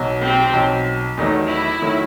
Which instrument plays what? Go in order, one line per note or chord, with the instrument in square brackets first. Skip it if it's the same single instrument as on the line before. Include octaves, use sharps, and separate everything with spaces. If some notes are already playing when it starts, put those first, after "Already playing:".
Already playing: [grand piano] B1 B2 F#3
[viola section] C4
[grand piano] B1 B2 F#3
[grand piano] E2 D#3 F#3 A3 [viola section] D#4
[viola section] E4
[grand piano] D#3 F#3 A3